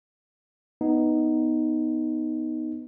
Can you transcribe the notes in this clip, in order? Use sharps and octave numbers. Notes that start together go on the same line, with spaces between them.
B3 D#4